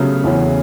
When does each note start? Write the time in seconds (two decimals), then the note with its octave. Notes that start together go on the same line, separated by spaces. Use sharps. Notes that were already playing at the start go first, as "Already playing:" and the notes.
Already playing: C#3 F#3 A3 B3
0.24 E2 E3 C#4